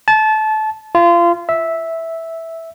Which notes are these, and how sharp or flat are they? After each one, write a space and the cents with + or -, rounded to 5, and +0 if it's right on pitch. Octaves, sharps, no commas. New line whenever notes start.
A5 -25
F4 -25
E5 -5